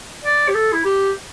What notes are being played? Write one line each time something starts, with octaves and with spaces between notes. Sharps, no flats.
D5
G4
A4
E4
G4